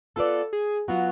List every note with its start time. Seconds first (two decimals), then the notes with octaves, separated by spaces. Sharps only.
0.16 B3 F4 A4 B4 D5
0.53 G#4
0.88 F#3 B3 F4 F#4